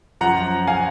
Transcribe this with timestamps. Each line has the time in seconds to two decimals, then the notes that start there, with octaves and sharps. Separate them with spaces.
0.21 F#2 F3 F#5 A#5
0.67 F5 G#5